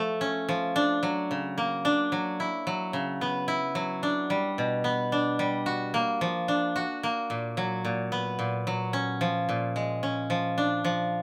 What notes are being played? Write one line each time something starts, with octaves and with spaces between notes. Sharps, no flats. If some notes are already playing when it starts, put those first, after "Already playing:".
Already playing: F3 A3
C#4
F3
D4
F#3
C#3
A#3
D4
F#3
E4
F#3
C#3
B3
E4
F#3
D4
G3
B2
B3
D4
G3
F#4
A#3
F3
D4
F#4
A#3
A#2
F#3
A#2
B3
A#2
F#3
C#4
F3
A#2
G#3
C#4
F3
D4
F3